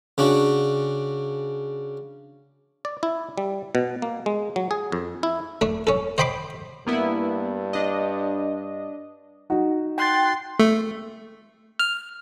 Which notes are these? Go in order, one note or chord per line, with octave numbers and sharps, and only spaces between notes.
C#3 D4 F#4
D5
E4
G3
B2
A#3
G#3
F#3
G#4
F2
E4
A3 D4
C#4 A4
C5 D#5 G5 B5 C6 D6
G2 A#3 B3 E4
D4 D#5
D#4 F#4
G5 C6 F#6 A6
A3
F6